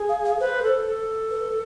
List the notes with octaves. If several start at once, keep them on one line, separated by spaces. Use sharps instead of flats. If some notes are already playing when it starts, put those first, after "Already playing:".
Already playing: G#4
F5
F5
B4 C5
A4
A4
B4